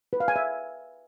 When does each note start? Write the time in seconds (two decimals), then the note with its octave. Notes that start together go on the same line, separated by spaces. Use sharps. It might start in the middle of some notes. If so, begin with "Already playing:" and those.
0.13 B4
0.20 F5
0.28 G#5
0.36 E5